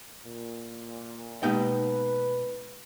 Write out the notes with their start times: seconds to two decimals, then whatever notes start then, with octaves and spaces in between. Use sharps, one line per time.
0.24 A#2
1.43 B2 G#3 A#3 D#4 G4 B4 G5